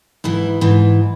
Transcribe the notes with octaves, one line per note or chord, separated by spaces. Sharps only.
G#2 E3 E4
G#2 E3